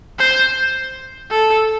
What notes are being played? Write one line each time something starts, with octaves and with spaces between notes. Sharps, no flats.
C5
A4